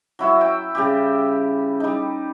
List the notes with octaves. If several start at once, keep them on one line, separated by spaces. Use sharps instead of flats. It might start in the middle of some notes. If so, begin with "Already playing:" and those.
F#3 E4 F#4 E5
G5
C#3 G3 G4
G3 D#4